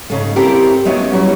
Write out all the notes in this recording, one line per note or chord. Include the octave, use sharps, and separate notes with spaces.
G#2 C#3 A3
C4 E4 G4 A4 A#4
G#3 A3 B3 C#4 F#4
F#3 G3 E4 F#4